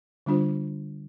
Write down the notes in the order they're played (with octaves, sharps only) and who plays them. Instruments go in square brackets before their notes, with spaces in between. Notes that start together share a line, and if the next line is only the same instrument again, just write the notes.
[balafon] D3 G3 D4 F4 C5